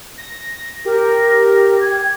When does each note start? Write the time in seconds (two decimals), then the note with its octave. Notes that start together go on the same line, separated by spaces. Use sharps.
0.18 A#6
0.85 G4 A#4
1.81 G#6